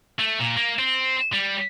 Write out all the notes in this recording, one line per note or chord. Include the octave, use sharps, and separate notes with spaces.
A3
A#2
A#3
C4
G3